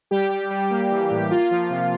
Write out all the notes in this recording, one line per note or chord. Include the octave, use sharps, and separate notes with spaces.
G3 G4
G3
G3
A#3
E3
A2
A#3 F4
F3
C3